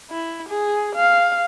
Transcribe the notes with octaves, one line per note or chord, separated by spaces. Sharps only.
E4
G#4
F5